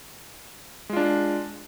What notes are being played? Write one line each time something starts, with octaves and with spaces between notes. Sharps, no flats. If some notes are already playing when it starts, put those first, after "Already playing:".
G#3 D4 F4